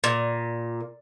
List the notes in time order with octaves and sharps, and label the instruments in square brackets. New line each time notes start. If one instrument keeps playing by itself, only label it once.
[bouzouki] A#2